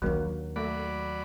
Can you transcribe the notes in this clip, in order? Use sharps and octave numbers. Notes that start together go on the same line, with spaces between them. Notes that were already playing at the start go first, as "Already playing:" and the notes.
D#2 F#3 A#3 D4
F#3 A3 D5 B5